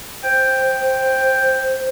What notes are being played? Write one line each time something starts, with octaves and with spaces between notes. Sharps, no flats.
C5 G5